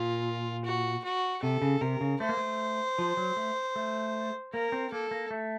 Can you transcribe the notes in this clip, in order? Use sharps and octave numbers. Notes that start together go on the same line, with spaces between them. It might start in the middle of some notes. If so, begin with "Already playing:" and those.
Already playing: A#2 F4
F#4
F#4
C3 A4
C#3
C3 A#4
C#3
A3 C5
A#3
A3
F3
F#3
A3
A3
A#3 A#4
C4
A#3 A4
A#3
A3